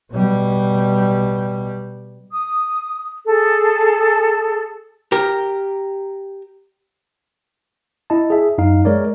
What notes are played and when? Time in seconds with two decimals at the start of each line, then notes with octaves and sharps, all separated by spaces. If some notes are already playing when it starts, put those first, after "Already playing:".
0.11 B2 G3
2.32 D#6
3.25 G#4 A4
5.12 G4 A#4
8.10 E4 D#5 A5
8.30 G#4 E5
8.58 F#2 D#4 F5
8.85 G#3 A#4 C#5 D5